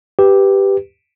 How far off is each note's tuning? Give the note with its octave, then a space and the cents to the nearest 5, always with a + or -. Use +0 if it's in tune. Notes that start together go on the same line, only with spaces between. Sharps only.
G4 +0 B4 +0